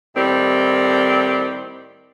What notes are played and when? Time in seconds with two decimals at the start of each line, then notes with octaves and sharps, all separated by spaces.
0.15 A2 D#3 G3 C4